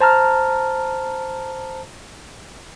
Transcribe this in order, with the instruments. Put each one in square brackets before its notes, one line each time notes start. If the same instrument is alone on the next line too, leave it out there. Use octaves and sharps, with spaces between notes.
[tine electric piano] C5 A5 A#5 F6